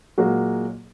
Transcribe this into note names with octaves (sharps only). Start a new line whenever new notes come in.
A#2 F#3 G#3 A#3 F#4